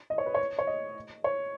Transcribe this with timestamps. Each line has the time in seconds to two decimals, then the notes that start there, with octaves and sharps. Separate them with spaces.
0.10 D#5
0.18 C#5
0.26 B4
0.35 C#5
0.59 C#5
0.67 D#5
1.24 C#5